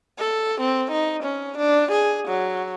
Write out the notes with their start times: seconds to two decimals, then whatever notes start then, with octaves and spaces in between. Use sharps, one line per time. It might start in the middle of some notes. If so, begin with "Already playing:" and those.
0.19 A4
0.60 C4
0.91 D#4
1.24 C#4
1.58 D4
1.91 G#4
2.28 F#3